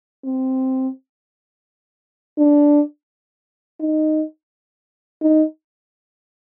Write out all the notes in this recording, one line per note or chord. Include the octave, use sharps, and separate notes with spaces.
C4
D4
D#4
D#4